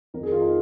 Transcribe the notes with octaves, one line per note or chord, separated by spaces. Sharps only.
F2 D#3 A#4
G#4
F4
D#4